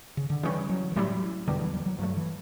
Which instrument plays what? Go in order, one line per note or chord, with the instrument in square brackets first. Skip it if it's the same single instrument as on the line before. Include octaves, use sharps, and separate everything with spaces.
[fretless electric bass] C#3
D3
[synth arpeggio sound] C#3 G3 C#4 [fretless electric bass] E3
[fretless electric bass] F#3
E3
[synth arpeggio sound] A2 G3 C#4 E4 [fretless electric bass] F#3
[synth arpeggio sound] E2 B2 G3 D4 G4 [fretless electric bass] D3
[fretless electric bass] E3
F#3
E3
F#3
[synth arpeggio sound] G2 D3 A3 [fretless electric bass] F#3
[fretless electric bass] E3